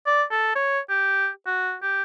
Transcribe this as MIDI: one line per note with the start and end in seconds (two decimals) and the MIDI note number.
0.06 0.23 74
0.31 0.51 69
0.55 0.79 73
0.89 1.28 67
1.46 1.75 66
1.82 2.03 67